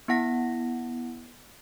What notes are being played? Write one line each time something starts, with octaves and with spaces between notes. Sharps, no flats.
B3 E4 F#5 A#6